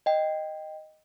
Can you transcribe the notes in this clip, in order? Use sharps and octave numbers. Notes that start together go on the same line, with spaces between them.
D#5 G5